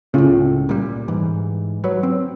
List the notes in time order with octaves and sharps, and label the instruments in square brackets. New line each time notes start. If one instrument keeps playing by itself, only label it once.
[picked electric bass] C#2 A2 [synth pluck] C#3 C#4 F4
[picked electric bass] A#2 G3
G#2 E3
[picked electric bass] F#3 [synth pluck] B4 C#5
[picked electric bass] C4